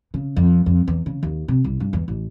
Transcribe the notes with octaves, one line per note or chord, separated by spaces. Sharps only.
C#3
F2
F2
E2
C#3
D#2
C3
C2
G2
E2
A1